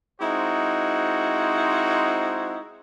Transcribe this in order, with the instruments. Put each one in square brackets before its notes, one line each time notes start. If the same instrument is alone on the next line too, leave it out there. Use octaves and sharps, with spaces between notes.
[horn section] G#3 C4 D#4 E4 F#4 C5